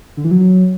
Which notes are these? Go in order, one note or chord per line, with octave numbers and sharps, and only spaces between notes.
D3
E3
F#3